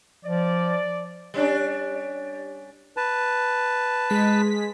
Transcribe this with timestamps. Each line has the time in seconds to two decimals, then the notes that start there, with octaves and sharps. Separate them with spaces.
0.25 F3 D5
1.34 G3 C#4 D4
2.97 B4 A5
4.10 G#3 B6